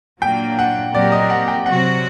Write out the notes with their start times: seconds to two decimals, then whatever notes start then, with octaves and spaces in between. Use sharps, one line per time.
0.22 A#2 F#3 A#3 D4 G5
0.59 F#5
0.94 A#2 F#3 C4 G4 A#4 D5
1.12 D#5
1.30 F#5
1.48 G5
1.66 C3 F#3 C4 F#4 F#5